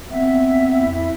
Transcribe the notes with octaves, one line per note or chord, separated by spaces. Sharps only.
B3 C4 E5
F2 E4